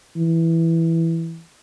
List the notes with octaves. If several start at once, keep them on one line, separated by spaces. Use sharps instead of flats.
E3